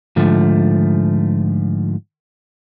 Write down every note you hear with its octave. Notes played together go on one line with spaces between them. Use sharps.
G#2 D3 F3 A3